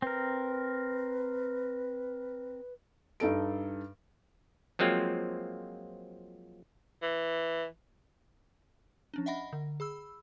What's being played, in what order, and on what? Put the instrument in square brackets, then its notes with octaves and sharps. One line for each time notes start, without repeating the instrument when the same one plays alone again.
[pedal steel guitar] C4 A#4 [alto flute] B4
[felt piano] G2 D#4 A4 D7
[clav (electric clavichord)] F3 F#3 G#3 A#3 C4 F4
[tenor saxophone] E3
[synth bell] F3 C#4 D4
D#5 E5 F#5 B5 A#6
D3
G#4 B5 E6